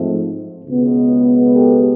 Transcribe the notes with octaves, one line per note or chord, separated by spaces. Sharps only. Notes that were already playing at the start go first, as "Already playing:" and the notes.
Already playing: G#2 F3 A3 C4
C#2 B2 G#3 B3
G4 A4